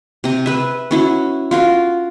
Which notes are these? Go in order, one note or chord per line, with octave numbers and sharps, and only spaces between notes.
C3 A#5
B4 E5
C#4 E4 F#4
F4 F#4 A#4